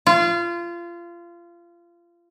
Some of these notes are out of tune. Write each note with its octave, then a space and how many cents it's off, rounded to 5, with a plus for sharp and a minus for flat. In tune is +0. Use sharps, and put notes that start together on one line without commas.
F4 -25